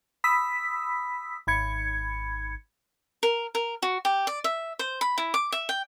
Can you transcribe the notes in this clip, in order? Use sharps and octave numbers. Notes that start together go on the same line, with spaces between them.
B5 D#6 E6 B6
G#1 B5 G#6 C#7
A#4
A#4
F#4
G4
D5
E5
C5
B5
E4
D6
E5
G5